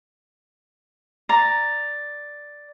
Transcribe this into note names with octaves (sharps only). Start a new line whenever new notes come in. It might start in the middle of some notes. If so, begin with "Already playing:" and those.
D5 A#5